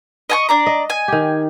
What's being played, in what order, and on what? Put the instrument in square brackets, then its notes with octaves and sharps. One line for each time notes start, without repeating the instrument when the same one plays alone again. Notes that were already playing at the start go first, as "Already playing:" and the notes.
[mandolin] D#5 G#5 C#6
D4 D5 A#5
[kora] D#5
[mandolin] G#5
[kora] D#3 G4